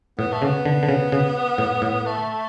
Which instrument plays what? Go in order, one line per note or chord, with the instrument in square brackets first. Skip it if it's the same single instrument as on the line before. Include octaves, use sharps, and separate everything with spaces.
[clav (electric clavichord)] A2 [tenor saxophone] B3
[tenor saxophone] A3
[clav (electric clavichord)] C#3
[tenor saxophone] B3
[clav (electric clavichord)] D3
D3
C#3
C#3
A2
A2
[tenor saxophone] A3